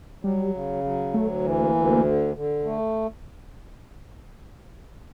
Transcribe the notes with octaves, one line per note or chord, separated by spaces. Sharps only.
F#3 G3
C#3
F#3
D2 A3
E3
A#3
D2
D3
D3
A3